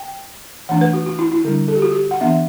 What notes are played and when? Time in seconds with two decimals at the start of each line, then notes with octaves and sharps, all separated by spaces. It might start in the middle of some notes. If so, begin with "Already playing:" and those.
Already playing: G5
0.69 E3 A3 D4 F#5
0.81 B4
0.93 F#4
1.06 F#4
1.19 E4
1.32 E4
1.45 D3 G3 D4
1.68 A4
1.75 G4
1.82 F#4
1.92 G4
2.11 F#5
2.20 E3 B3 D4 E5